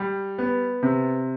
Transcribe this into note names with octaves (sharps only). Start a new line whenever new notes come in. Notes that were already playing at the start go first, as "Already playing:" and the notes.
Already playing: G3
B3
C3